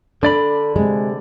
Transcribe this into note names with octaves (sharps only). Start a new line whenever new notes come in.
D3 D4 A4 D5 B5
C3 G#3